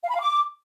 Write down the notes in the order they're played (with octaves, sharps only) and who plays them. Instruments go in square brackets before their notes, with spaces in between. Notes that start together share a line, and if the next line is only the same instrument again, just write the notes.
[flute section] F5
B5
F5
D6